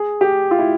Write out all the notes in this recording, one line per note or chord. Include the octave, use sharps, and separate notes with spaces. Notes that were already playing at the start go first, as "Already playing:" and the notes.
Already playing: G#4
G4
F4
E4